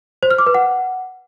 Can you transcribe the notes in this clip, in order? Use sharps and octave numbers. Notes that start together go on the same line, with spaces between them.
C5
F6
D6
B4
F#5